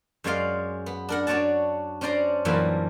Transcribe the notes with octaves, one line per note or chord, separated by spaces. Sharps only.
F#2 G#3 C#5 D5 F5 C6
B3
D4 A#4 F#5
D4 F#4 C#5 D5 F#5 A5
C#4 D4 C5 D5 A#5 C6
F#2 A#2 E3 G3 A#3 A5